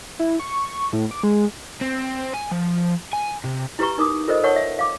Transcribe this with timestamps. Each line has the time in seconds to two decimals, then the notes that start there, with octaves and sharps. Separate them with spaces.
0.19 E4
0.39 C#6
0.93 A2
1.11 D6
1.23 G#3
1.81 C4
2.33 G#5
2.51 F3
3.13 G#5
3.44 C3
3.79 E4 G4 B4 A#5 C#6
3.98 D#4 A#4 D6 D#6
4.28 F4 A4 A#4 C5 D#5
4.43 A#4 C#5 F#5 A5 C#6
4.56 E5
4.79 F5 D6